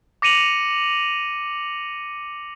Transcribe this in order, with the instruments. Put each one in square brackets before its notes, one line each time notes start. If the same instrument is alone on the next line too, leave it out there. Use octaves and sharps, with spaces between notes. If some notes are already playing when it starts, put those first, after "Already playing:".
[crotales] D6 A#6 C#7 D#7 F7 F#7